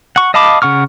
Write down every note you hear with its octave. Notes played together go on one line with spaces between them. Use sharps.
F#5 C#6
D#5 F5 A5 B5 D6
C#3 F#5 C#6 F6